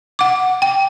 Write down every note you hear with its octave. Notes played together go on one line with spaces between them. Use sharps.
F#5 D6
G5